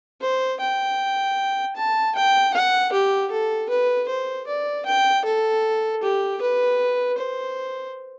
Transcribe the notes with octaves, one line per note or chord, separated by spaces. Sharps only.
C5
G5
A5
G5
F#5
G4
A4
B4
C5
D5
G5
A4
G4
B4
C5